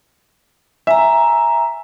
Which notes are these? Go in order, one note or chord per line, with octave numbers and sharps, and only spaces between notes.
E5 G#5 A#5